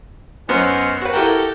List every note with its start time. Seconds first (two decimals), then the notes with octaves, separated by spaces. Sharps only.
0.49 F#2 B3 C#4 D#4 C5
1.01 F#4 B4
1.13 E4 F#4 G4 A4 A#4